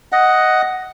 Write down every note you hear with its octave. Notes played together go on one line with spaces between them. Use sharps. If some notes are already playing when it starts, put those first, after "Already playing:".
D#5 F#5